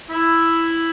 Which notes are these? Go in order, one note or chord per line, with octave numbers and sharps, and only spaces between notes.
E4